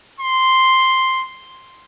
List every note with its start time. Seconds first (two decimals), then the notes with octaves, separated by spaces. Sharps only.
0.20 C6